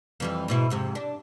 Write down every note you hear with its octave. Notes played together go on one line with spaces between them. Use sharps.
F2 E3 G3
G#2 B2 E4
F2 G#2 C3
D4